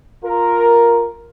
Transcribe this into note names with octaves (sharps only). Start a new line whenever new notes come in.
F4 A#4